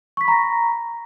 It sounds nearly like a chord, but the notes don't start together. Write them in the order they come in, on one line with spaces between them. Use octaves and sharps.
C#6 B6 B5 A#5 A#6